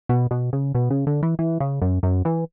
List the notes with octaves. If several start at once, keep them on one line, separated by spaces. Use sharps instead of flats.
B2
B2
C#3
B2
C#3
D3
E3
E3
C#3
F#2
F#2
E3